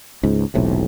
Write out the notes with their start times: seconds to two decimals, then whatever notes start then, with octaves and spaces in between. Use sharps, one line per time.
0.23 C#2 G#2
0.54 E1 B1 A2 C3